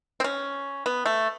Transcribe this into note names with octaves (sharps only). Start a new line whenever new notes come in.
C4
C#4
B3
A3